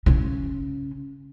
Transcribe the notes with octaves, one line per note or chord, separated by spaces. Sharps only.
C#3 C#4